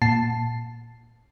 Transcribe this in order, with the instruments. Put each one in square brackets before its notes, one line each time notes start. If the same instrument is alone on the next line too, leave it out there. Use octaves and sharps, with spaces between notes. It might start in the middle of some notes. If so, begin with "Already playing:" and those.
[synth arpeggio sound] A#2 A5 C7